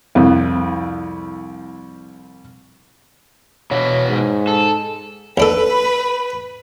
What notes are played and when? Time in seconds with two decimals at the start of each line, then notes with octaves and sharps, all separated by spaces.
0.15 C2 F2 E4
3.71 B2 E3 B3 C#5
4.09 G#2
4.47 A4
5.38 D#2 D4 A4 B4 B5